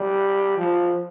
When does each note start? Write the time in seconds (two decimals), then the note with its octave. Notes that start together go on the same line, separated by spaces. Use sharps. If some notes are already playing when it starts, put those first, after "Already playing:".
Already playing: G3
0.57 F3